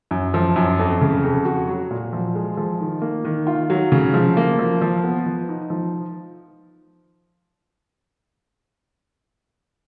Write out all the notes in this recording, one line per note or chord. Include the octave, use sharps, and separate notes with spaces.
F#2
F3
F#2
F2
C#3
F2
F#4
F#3
A#2
F3
G#3
F3
D#3
A#3
D#3
F4
F#3
C#3
F3
A#3
F3
F3
B3
F3
D#4
F3